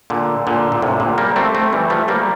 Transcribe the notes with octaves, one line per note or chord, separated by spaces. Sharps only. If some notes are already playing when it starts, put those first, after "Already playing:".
A#2 D3
A#2 D3
A#2
A2 C3
A#2 D3
G3 A#3
A3 C4
A3 C4
E3 G3
F3 A3
G3 A#3